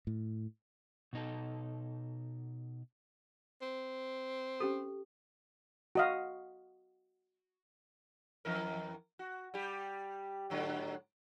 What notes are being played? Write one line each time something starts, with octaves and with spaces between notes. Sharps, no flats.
A2
B2 D#4 A4
C4
C#4 G4 A4
F#4 D#5 F5
F2 E3 A#4
F#4
G3 G4
G#2 D3 F#3